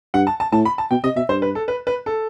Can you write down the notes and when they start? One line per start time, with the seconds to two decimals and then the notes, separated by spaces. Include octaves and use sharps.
0.14 G2 F#5
0.27 A5
0.40 A5
0.52 A2 A5
0.65 B5
0.78 A5
0.91 B2 G5
1.04 C3 D#5
1.16 B2 E5
1.29 G2 C5
1.42 B4
1.55 A4
1.68 B4
1.87 B4
2.06 A4